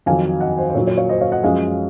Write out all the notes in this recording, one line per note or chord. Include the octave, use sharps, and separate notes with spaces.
F2 D#3 F#3 F5 G#5
D#5 F#5
C5
C5
A#2 F#3 C#5
C#5
C#5 F5
C5 D#5
C#5 F5
D#5 F#5
F#2 F3 G#3 F5 G#5